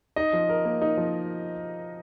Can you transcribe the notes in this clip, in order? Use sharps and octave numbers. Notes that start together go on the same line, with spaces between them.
D#4 D#5
F3
A#4
A#3
D#4
F3